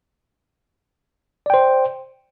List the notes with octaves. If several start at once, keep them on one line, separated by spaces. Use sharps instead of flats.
C5 D5 G5